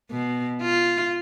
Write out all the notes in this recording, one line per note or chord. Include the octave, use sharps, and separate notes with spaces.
B2
F4